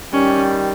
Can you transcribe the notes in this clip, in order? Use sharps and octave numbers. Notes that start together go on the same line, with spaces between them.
D#3 G3 C#4